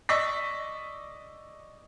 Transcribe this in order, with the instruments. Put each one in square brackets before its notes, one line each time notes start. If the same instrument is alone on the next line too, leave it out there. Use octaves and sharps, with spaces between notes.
[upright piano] D5 D#5 C#6 E6 B6